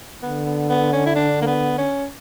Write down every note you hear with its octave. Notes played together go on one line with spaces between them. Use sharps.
D3 B3
B3
B3
C#4
E4
D4
A#3
B3
C#4